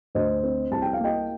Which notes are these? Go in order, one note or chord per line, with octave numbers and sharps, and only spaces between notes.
D2 C5 D#5
C4
C2 A5
G5
F5
A#3 D#5 G5